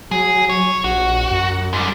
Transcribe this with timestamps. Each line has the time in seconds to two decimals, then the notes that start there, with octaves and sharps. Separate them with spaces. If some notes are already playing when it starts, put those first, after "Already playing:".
0.11 F#3 G#4
0.50 C#5
0.84 A#1 F#4
1.31 F#2
1.73 G#2 G3